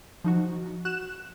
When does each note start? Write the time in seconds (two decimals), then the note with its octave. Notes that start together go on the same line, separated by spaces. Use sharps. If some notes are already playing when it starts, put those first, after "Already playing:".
0.24 F3 D#4 F#4
0.85 F#4 F#6 E7